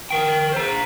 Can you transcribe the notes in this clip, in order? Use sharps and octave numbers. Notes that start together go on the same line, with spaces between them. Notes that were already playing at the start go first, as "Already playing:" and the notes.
A#4 G5
C5 A#5